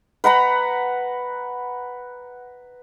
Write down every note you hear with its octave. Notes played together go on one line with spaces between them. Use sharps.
B4 F#5 A#5 B5